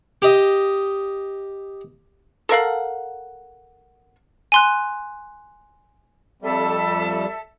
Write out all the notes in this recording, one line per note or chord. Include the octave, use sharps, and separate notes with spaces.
G4 D#5
A4 A#4 F5 F#5
G#5 C6 F#6
F2 G3 A4 E5